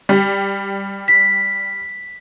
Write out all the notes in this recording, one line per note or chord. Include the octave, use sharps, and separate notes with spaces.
G3
B6